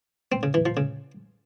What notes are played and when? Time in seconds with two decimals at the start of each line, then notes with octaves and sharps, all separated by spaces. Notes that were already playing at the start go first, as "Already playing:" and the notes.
0.32 C4
0.43 C#3
0.54 E3
0.66 F3
0.77 C#3